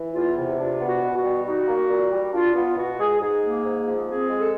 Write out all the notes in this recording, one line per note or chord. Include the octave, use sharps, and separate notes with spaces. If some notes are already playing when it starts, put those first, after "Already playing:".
Already playing: E3
E2 F4
C3
D4 F4
B3
F#4
B2
F#4
G3
D#4 F#4
A#3
A#2
G3
D4 F4
B3 F4
B2 F#4
G#3 G#4
G#2 G#4
A#3
G#2
F3
C4 G#4
G#3
A4